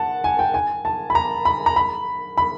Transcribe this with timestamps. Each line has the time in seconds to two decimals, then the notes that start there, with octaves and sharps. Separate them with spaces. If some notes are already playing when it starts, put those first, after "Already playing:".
Already playing: F#5 A5
0.24 G#5
0.39 G5
0.54 G#5
0.85 A5
1.10 B5
1.15 A#5
1.45 B5
1.66 A#5
1.76 B5
2.38 B5